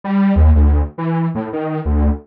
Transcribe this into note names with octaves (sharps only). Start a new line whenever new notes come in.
G3
D#2
D2
E3
A2
D#3
D2